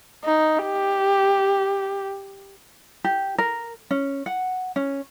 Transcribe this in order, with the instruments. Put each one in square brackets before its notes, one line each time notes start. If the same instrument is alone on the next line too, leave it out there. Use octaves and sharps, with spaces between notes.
[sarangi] D#4
G4
[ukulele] G4
A#4
C#4
F#5
C#4